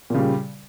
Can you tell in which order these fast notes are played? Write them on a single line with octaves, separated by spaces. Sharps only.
A#2 C#3 G3